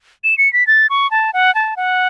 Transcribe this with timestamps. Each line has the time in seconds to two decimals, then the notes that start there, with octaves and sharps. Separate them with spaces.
0.24 E7
0.38 C#7
0.53 B6
0.67 A6
0.90 C#6
1.11 A5
1.34 F#5
1.55 A5
1.77 F#5